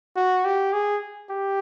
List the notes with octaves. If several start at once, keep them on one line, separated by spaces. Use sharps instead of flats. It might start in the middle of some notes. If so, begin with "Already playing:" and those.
F#4
G4
G#4
G4